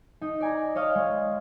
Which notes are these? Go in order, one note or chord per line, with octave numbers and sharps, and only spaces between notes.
D#4
D5 G#5 A#5
C#5 D#5 F5
G#3